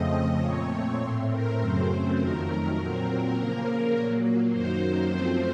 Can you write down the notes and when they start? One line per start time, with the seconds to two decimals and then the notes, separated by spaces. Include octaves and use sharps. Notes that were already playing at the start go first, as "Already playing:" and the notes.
Already playing: F2 C#3 F3 A3 C4 D#5
0.42 A#2 A3 C4 C#5
1.00 A2 A3 C4 C5
1.29 A#4
1.59 F#2 C#3 F#3 A3 C4 C5
2.17 F2 D#3 F#3 A3 A#4
2.76 A#2 F#3 C4 A#4
3.34 C#3 F3 A#3 A#4
3.92 A#2 F#3 A#3
4.50 F#2 D#3 F#3 A#3 C5
5.09 F#2 F3 A3 C4 C5